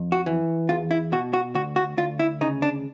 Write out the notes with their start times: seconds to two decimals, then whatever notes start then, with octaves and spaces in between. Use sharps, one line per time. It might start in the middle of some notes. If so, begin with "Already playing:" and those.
Already playing: F2
0.12 F#4
0.26 E3
0.69 E2 F4
0.91 E4
1.12 B2 F#4
1.33 F#4
1.55 D2 F#4
1.76 F#4
1.97 D2 F4
2.19 E4
2.41 C#3 D#4
2.62 D4